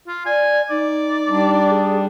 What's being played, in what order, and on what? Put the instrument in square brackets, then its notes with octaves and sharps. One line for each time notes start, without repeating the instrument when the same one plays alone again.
[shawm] F4
[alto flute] D5 [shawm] G#5
[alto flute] D#4 [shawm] D5
[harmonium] G3 D4
[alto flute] G#4